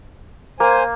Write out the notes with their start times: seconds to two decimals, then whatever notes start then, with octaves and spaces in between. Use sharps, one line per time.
0.60 A#3 C5 G#5